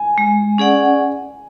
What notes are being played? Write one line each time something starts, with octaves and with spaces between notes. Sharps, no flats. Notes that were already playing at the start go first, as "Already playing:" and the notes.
Already playing: G#5
G#3
C#4 G#4 D5 F#5